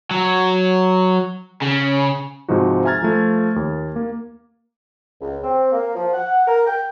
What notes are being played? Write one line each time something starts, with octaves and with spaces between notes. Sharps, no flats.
F#3
C#3
G#2 C3 F3 D#4 F#4
E5 G#5 A#5 F6 G#6 A6
F3 A3
D#2
A#3
C#2
C4
A#3
F3
F#5
A#4
G5